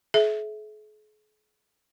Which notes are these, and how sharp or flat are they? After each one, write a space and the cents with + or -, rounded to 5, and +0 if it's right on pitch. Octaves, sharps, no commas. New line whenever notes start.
G#4 +45 E5 -10